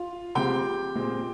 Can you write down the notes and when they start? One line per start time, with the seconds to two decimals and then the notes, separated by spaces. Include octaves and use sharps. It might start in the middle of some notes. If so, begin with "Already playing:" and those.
Already playing: F4 F5
0.35 C3 F3 G#3 C4 G4 G5
0.95 A#2 G#3 C4